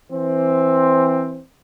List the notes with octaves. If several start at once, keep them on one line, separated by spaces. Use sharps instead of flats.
E3 C4